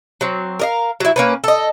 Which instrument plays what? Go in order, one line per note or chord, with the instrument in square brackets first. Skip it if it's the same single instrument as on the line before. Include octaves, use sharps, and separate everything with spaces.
[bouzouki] F#3 C4
A#4 D#5 F5
F#3 E4
A#3 C#4 B4
A4 D#5